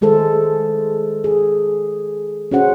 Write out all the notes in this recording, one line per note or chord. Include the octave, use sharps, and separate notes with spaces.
D#3 G#3 G#4 A4 C5
G#4
C#4 F#4 G#4 C5 F#5